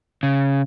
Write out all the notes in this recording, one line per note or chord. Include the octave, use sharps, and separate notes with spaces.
C#3